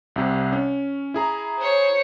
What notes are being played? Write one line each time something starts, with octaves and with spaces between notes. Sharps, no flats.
C2 C3
C#4
E4 G#4 A#5
C5 C#5